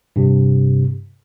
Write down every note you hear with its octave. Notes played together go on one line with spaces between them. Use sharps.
G2 C3